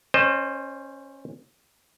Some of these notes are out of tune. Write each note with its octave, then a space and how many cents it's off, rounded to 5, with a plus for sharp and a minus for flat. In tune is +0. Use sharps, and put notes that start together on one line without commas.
C#4 -15 C5 +10 D#5 -30